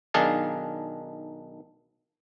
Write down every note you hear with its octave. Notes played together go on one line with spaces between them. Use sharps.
B1 D#3 D4 G#4 F5 A5